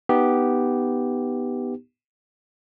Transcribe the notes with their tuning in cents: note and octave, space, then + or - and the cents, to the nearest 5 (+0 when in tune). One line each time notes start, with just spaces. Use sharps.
B3 +0 D#4 -5 G4 +0